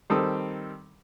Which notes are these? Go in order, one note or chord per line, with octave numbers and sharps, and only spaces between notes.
D#3 G3 C4 A4 D#6